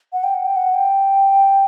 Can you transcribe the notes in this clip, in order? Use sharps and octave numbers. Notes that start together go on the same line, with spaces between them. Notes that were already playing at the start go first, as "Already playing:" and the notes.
F#5
G5
F#5
G5
F#5
G5